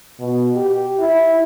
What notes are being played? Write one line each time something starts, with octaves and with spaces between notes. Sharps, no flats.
B2
G4
E4